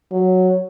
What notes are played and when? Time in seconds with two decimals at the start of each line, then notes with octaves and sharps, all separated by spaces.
0.12 F#3